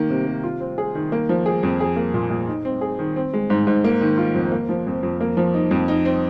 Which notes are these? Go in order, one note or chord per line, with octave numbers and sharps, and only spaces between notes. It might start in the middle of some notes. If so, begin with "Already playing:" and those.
Already playing: D#3 A#3
C3
C3
F4
C4
G#4
D#3
A#3
F3
G#4
F2
G#4
A#3
A#2
A#2
D#4
C4
G#4
D#3
C4
G#3
G#2
G#2
A#3
D#3
F4
F2
A#3
F3
F2
F2
A#3
F3
D#4
F2
D#4
C4